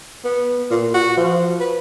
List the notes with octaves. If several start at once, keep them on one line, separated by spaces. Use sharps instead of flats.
B3
A#2
F#4
F3
B4